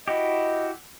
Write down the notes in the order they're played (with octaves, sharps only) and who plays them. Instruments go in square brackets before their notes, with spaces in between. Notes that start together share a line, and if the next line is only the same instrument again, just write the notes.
[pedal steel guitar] E4 F#4 G4 [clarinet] D#5